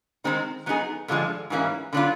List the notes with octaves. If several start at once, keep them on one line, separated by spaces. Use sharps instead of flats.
D#3 G#3 C4 D#4
F#3 B3 D#4 G#4
G2 D3 F3 G#3
G#2 E3 G3 A#3 C#4
D3 F#3 B3 D4 F4